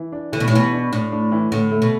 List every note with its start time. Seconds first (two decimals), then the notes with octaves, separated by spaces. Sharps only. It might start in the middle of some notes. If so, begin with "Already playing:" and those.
Already playing: E3
0.12 D4
0.32 D3 E3
0.40 B2
0.48 A2
0.52 B2 E3
0.72 D4
0.92 A2 D4
1.12 D4
1.32 E3
1.52 A2 D3
1.71 A3
1.82 B2